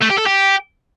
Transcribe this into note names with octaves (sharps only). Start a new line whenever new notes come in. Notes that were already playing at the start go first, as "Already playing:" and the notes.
A3
G4
A4
G4